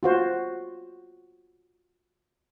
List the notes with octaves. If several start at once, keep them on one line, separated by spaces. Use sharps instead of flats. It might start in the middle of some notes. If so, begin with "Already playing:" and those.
F4 F#4 C5